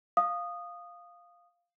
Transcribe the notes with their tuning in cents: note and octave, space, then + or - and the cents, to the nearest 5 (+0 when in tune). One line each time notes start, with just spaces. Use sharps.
F5 +0 D#6 -15